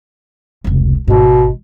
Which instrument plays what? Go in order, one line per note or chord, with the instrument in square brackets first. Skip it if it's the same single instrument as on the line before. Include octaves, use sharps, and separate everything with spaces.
[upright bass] F1 C#2
[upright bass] G#1 G#2 [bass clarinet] B2